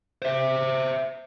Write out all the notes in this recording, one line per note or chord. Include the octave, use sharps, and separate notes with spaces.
C5 E5